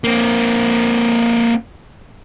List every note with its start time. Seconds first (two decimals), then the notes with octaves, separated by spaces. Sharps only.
0.04 A#3 C4